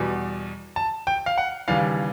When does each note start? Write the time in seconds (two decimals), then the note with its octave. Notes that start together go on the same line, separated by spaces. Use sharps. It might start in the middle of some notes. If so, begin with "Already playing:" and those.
Already playing: E2 B2 G3
0.76 A5
1.07 G5
1.26 F5
1.38 F#5
1.68 D#2 C#3 E3 G3 F5